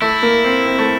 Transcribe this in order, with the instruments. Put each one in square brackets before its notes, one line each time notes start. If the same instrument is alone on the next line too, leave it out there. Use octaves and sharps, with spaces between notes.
[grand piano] A3 [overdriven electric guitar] E4
[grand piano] A#3
C4
C4
A3